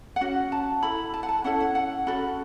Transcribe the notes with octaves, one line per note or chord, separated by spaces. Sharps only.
F#5
C#4 F#4
A5
E4 A4 B5
A5
F#5
A5
C#4 E4 A4 F#5
F#5
F#5
C#4 F#4 A4 B5